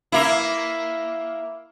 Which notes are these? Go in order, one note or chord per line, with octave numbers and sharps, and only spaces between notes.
A#3 E4